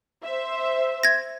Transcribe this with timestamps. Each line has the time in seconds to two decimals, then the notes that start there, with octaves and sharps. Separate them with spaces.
0.24 C5 E5
1.03 G#6 A#6